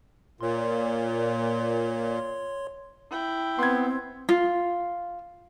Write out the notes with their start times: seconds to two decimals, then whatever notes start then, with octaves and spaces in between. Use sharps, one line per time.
0.41 A#2 C#5 C6
3.10 E4 G5
3.59 B3 C4 C6 G#6
4.29 F4